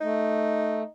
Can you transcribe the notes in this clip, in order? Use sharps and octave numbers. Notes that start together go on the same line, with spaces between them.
A3 D#4